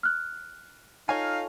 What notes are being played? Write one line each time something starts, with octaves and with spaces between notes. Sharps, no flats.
F6 F#6
D#4 F4 A4 C#5 F5 G#5